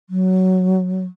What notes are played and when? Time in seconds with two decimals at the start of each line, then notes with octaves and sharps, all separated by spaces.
0.10 F#3